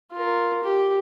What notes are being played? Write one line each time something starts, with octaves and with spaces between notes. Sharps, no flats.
F4 A#4
G4